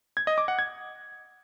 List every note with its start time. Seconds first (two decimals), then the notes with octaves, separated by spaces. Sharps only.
0.17 G#6
0.27 D#5
0.38 D6
0.48 F#5
0.59 G#6